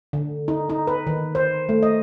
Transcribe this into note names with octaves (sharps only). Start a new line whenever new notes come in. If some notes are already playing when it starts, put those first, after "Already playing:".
D3
D#4
D#4
B4
D#3
C5
A3
D#5